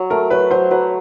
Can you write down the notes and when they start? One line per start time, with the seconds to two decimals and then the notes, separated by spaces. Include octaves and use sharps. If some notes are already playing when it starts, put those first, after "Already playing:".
Already playing: F#3
0.10 A3 A#4
0.30 F#3 B4
0.51 F#3 C5
0.71 F#3 B4